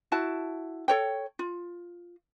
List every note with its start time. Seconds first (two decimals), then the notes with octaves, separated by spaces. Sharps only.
0.12 E4 F#4 A5
0.88 A4 C#5 G5
1.39 F4